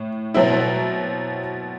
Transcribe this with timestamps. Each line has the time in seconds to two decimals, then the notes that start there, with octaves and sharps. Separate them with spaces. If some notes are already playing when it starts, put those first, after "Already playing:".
Already playing: A2
0.34 B2 F#3 C4 E4